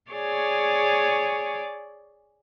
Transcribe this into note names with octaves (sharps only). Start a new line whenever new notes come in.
G#4 C#5 D5